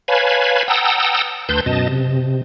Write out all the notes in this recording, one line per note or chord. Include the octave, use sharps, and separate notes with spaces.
B4 C#5 F5 G#5 A5 B5
F#5 G5 A5 A#5 D#6 E6
D2 B4 A5 C6 G6
F#2 B2 D#5 A5
C3